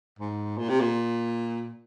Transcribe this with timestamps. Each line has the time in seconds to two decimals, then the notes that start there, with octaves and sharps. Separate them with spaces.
0.19 G#2
0.58 A#2
0.69 C3
0.80 A#2